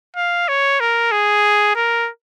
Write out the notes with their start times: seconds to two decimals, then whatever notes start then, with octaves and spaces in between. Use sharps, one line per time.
0.16 F5
0.49 C#5
0.80 A#4
1.12 G#4
1.75 A#4